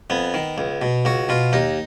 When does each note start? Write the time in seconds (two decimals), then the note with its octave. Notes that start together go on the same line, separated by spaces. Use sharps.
0.10 F2 B3
0.34 D#3
0.58 C#2
0.82 B2
1.05 C#2 F#4
1.29 B2 F4
1.53 D#2 D#4